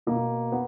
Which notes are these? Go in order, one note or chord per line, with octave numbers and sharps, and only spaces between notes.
B2 A#3
B3